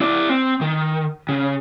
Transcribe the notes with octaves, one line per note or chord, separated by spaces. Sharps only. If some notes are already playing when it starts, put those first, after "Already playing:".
E4 D5
C4
D#3
C#3